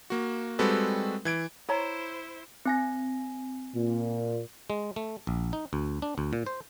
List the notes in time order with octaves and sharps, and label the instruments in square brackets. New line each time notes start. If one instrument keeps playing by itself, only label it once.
[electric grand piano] A#3 F#4
G3 G#3 C4 F#4 A4 B4
E3 G#6 D7
[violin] E4 C5 [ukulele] C#5 A#5
[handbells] C4 G#5 A#6
[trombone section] A#2
[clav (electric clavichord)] G#3
A3
A#1
D#4
D2
D4
D2
A#2
C5